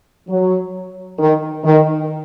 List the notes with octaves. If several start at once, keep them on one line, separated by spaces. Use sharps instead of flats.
F#3
D#3
D#3